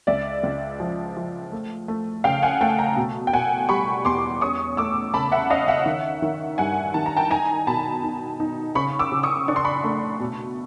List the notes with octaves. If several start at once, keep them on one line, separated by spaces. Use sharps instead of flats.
C#2 D5 E5
C#2
F3
F3
A3
A3
C#3 F5 G5
F#5 G#5
A3 G5 A5
G#5 A#5
B2
G5
B2 F#5 G#5
G3 B5 C#6
E2 C6 D6
C#4 C#6 D#6
A3 D6 E6
C#3 A5 B5
E5 F#5
C#4 D#5 F5
E5 F#5
D#3
D#3
G2 F#5 G#5
D#3 A5
A#5
G5 A5
D#4 G#5 A#5
B2 A5 B5
D#4
D#4
C#3 B5 C#6
D6 E6
C#3
C#6 D#6
D4 C#6
C6
B5 C#6
A3
B2